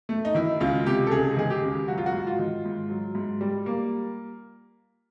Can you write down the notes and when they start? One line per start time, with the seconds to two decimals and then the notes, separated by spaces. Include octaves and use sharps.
0.09 A3
0.25 D#4
0.35 D#3 E4
0.60 C#2 F4
0.86 C3 G4
1.07 A4
1.11 C#2 G#4
1.36 D#3 G#4
1.50 G4
1.63 C#2
1.88 F#3 F#4
1.98 F4
2.06 F#4
2.13 G#2
2.27 F4
2.38 D#3
2.65 G#2
2.90 F#3
3.15 G#2
3.41 G3
3.66 A#3